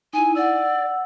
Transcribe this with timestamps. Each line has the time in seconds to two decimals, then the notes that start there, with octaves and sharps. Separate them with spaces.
0.13 D#4 E4 G#5
0.35 D5 F#5 E6